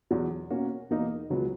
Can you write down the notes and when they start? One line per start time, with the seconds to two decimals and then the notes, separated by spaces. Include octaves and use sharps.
0.11 E2 B2 F#3
0.50 B2 A#3 C#4 F#4
0.90 E2 B2 A#3 D#4
1.30 C#2 B2 F#3 B3